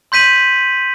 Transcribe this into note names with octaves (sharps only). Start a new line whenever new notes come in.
C6 G6 B6 D#7 F#7